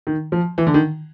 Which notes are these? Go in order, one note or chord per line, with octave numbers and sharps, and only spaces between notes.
D#3
F3
E3
D3
D#3